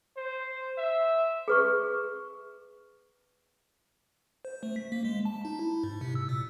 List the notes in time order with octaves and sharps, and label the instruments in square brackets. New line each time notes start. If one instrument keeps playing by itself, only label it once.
[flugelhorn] C5
E5
[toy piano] G#4 B4 C#6
[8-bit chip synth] C5
A3
B6
A#3
G#3
A5
D#4
E4
G#2
C3
E6
A#2